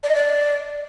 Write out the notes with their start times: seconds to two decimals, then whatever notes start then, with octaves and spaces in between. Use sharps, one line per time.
0.03 D5
0.09 D#5
0.15 D5